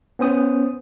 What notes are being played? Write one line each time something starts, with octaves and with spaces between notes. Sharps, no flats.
B3 C#4 C5 D#6